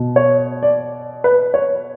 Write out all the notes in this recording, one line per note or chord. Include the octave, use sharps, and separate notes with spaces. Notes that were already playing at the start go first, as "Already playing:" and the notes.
Already playing: B2
C#5
D5
B4
C#5